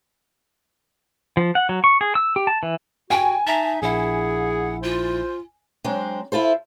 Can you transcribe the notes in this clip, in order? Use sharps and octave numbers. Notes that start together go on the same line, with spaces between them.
F3
F#5
F#3
C#6
G#4
E6
G4
A5
E3
F#4 G5 G#5
D#4 E5 A5 A#5
A#1 E4 G#4 F#5
F4 C5
F#3 G#3 C4 D4
E4 F4 A4 C5